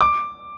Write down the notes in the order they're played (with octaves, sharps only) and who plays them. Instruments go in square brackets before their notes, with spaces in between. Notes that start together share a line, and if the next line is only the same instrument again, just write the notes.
[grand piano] D6